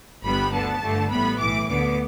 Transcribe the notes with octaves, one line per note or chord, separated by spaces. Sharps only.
G1 G2 G3 B3 B5
D2 D3 B3 A5
G1 G2 D3 A3
A1 A2 G3 B3 B5
B1 A2 E3 D6
D2 D3 B3 D6